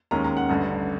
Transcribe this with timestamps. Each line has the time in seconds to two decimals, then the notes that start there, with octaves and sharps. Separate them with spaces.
0.11 D#2 D#3 G#3 C#4 A#5
0.24 A#5
0.37 F#5
0.49 A1 G2 D3